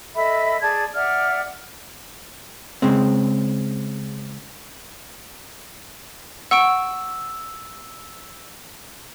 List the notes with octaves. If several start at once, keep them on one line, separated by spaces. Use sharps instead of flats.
A4 D#5 E5 B5
G#4 D5 A5 G#6
D5 E5 F#5 F6
C#3 G#3 C4
F#5 C#6 E6 D7